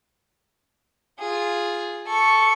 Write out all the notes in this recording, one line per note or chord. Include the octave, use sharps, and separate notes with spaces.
F4 G#4
A4 C#6